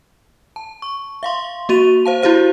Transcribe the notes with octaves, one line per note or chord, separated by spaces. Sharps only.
A5
C#6
E5 F5 C6
A#3 F#4 D#7 F7
C5 F5 A5
E4 F#4 G4 C5 F5